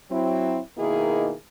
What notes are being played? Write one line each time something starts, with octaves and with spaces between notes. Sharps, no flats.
F#3 C4 E4
B2 D#3 A#3 D#4 E4 G#4